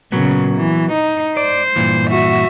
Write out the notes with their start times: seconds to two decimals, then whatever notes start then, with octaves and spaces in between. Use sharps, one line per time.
0.12 A#2 C#3 F#3 B3
0.56 E3
0.92 D#4
1.37 C5 D5
1.76 G2 A#2 E3
2.09 F#4 E5